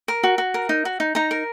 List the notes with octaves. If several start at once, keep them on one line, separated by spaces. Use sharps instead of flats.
A#4
F#4
F#4
A#4
D#4
F#4
D#4
D#4 A#5
A#4